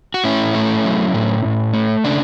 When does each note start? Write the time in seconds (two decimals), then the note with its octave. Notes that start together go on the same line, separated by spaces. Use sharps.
0.14 F#4
0.24 A2 C#4 E4
0.55 A3
0.85 F#3
1.14 A2
1.45 A2
1.74 A3
2.04 C#3 D4